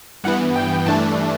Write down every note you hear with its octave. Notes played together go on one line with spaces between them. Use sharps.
G2 E3 B3 F#5
G5
G2 E3 A3 D4 A5